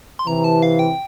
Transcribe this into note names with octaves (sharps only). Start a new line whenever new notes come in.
C6
C3 E3 A#5
A5
F5
G5